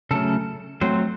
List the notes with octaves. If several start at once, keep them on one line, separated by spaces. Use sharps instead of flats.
C#3 F#3 A3 C#4 A4
F#3 A3 C4 C5